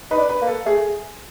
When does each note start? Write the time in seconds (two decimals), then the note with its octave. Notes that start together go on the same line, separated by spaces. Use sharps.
0.11 D#4 B4
0.18 D4
0.29 B4
0.42 A#3
0.47 A4
0.66 A3 G#4